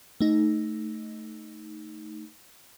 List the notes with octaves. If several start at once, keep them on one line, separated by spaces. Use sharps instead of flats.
A3 D#4